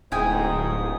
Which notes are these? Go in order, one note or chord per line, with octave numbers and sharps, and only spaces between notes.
D1 G#2 E4 G5 G#5 D#6